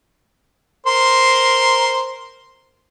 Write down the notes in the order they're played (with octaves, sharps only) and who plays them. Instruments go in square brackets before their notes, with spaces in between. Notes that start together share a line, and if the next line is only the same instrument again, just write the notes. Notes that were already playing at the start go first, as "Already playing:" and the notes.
[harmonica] A#4 C5 C6